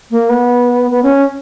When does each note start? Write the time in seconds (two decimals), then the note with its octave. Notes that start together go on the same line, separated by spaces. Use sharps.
0.11 A#3
0.29 B3
0.91 B3
1.03 C#4